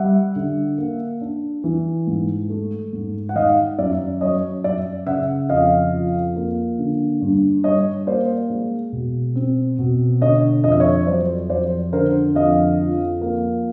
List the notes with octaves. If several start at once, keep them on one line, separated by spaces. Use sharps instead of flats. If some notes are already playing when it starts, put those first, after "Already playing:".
Already playing: G3 E5 F#5
D3
A#3
D4
E3
G#2
A3
G#2
F#5
D#3 D#5 F5
F#2 D5 E5
F#3 C#5 D#5
F#2 D5 E5
C#3 E5 F#5
F2 D#5 F5
F3
A#3
D3
G2
G3 C#5 D#5
A#3 C5 D5
G#3
B2
C4
B2
D3 C#5 D#5
F2 D#5
E5
C#5 D#5
F#3 C5 D5
F2 C5 D5
D3 A#4 C5
F2 D#5 F5
F3
A#3